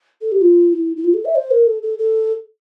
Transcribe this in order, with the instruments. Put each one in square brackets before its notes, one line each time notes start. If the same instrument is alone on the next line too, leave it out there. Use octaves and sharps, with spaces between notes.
[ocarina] A4
G4
F4
E4
E4
F4
A4
E5
C5
A#4
A4
A4
A4